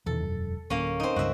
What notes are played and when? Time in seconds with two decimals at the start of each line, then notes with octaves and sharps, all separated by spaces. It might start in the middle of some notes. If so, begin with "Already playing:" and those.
0.06 E2 B2 D#3 A4
0.20 E1 F#2
0.70 D1 A#3 C#4
1.00 C4 D#4
1.16 C#2 G2 F#4 E5